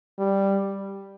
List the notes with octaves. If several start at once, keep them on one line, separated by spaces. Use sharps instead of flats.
G3